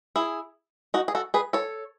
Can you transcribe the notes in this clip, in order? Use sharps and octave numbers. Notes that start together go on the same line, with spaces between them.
E4 G#4
D#4 F#4
G#4
F#4 A4
G#4 B4
A4 C#5